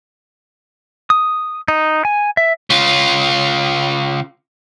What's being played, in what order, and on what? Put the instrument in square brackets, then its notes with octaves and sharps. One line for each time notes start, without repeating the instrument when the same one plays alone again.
[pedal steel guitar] D#6
D#4
G#5
E5
[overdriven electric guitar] C#3 F4